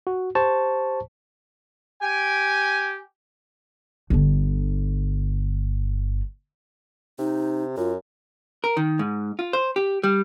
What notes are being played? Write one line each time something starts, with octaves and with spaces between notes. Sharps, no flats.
F#4
G4 C5 A5 C#6
G4 G5 G#5
G1 D3
C3 D#4
F#2 F4
A#4
D#3
G#2
F4
C5
G4
G3